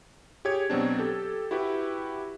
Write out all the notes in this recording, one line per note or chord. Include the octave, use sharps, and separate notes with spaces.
G4 G#4 C#5 G#6
B2 F#3 C4 D4
G4 A4
E4 F#4 G4 B4